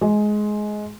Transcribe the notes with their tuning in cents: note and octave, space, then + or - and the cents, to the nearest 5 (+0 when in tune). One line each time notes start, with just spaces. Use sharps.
G#3 +15